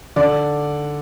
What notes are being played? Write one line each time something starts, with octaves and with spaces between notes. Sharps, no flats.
D3 D5